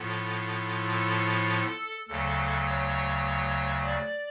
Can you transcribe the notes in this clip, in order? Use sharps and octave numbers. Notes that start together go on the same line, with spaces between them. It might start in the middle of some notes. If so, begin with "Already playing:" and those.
Already playing: A2 F3 B3 F4 A4
A4
D2 C#3 F#3 A4
C#5
D5